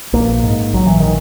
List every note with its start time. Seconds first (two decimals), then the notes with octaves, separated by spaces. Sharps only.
0.13 A#1 A#3
0.44 G#2
0.73 A#1 F#3
0.87 E3
1.00 D#3